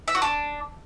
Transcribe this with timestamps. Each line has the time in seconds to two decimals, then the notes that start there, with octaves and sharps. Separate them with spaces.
0.08 E5
0.15 F#4
0.22 D4